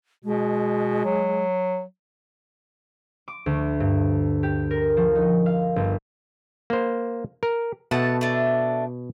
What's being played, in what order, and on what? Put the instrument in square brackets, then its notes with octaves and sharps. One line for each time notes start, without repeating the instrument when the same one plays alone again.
[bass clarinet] B2 [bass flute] G#3
[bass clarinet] F#3
[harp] D6
D2
G2
G4
A#4
F3
D#4
F5
G1
[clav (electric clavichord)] A#3 C5
A#4
[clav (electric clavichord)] B2 [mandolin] A3 F#5 A5
[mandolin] A3 D4